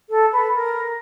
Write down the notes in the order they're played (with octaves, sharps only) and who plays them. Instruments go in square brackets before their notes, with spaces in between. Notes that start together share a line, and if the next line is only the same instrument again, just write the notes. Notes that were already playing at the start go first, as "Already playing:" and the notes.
[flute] A4
B4
A#4